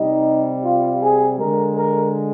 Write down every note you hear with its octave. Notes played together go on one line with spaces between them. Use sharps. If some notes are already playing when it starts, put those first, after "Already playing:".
Already playing: C3 G3 D#4
F4
G#4
D3 G#3 A#4
A#4